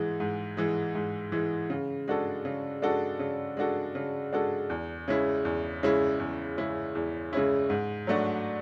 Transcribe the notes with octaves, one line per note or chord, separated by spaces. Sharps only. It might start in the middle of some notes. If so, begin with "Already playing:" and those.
Already playing: G#2 E3 G#3
G#2
E3 G#3
G#2
E3 G#3
C#3
G#3 D4 F#4 A4
C#3
G#3 D4 F#4 A4
C#3
G#3 D4 F#4 A4
C#3
G#3 D4 F#4 A4
E2
C#3 G#3 C#4 E4
E2
C#3 G#3 C#4 E4
E2
C#3 G#3 C#4 E4
E2
C#3 G#3 C#4 E4
G#2
F#3 A3 D4 F#4